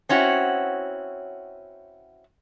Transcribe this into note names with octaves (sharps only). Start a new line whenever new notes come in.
C4 C#4 E4 F#4